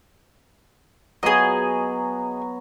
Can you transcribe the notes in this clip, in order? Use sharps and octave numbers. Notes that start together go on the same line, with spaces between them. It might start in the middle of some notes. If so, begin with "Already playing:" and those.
F#3 B3 G#4 D#5